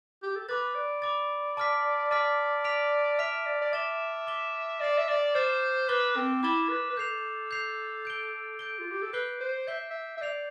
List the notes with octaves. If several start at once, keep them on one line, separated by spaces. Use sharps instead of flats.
G4
A4
B4 B5 D6 A6
D5
B5 D6 A6
A5 D6 F6 B6
D5 A5 D6 F6 B6
F6 B6 D7 F7
E5 F6 B6 D7 F7
D5
D5
E5 D6 A6 E7 G7
D6 A6 E7 G7
D5 D6 F6 A6 C7 E7
E5
D5
C5 D6 F6 A6 C7 E7
B4 D6 A6 E7 G7
C4
E4 D6 A6 E7 G7
B4
B4
A4 G6 C7 F7
G6 C7 F7
G6 D7 G7
G6 D7 G7
F4
G4
A4
B4 G6 C7 G7
C5
E5 G6 C7 G7
E5
E5
D5 G6 C7 F7